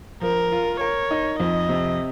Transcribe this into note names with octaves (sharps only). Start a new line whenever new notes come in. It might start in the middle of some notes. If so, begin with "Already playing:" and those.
F3 A#4
F4
A#4 C#5
D#4
F2 D#5
C3